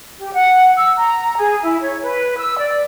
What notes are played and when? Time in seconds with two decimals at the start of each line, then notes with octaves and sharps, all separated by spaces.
0.19 G4
0.33 F#5
0.77 E6
0.96 A#5
1.37 G#4
1.62 E4
1.81 C#5
2.02 B4
2.39 E6
2.59 D5